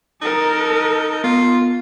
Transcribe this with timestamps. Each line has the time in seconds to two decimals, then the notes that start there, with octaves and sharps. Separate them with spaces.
0.22 D#4 A4 A#4
1.24 B3 F4